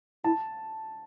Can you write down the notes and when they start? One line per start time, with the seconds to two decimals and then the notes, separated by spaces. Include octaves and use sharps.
0.24 E4 A5